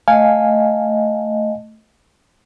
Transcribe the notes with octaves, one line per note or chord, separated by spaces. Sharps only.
A3 D#5 F5 G#5